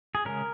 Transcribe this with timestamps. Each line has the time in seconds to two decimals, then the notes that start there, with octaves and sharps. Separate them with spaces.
0.15 G#4
0.25 C#3 G#3 C#4 A#4